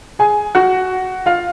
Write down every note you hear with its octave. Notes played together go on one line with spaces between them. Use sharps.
G#4 G#5
F#4 F#5
F4 F5